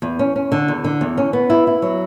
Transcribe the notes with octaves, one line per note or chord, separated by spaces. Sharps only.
E2
C#4
C#4
D3
E2
D3
E2
C#4
B3
E4
E4
F#3